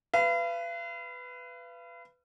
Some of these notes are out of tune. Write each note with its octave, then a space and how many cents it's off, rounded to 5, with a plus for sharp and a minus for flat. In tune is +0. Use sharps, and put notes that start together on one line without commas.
B4 +10 F5 -40